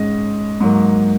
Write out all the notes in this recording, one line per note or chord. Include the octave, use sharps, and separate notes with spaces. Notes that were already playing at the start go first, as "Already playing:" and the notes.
Already playing: G#2 G#3 C#4 D#5
G#2 F#3 A#3